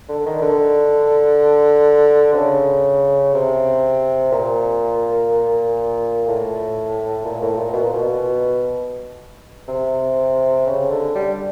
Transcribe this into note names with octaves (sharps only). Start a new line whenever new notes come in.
D3
D#3
D3
C3
C#3
C3
A#2
A2
A#2
A2
A#2
B2
A#2
B2
C3
C#3
D3
G3